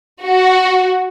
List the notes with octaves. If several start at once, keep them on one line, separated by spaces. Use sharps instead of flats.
F#4